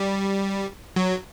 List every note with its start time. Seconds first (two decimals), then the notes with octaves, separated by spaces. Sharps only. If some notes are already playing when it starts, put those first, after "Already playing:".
Already playing: G3
0.96 F#3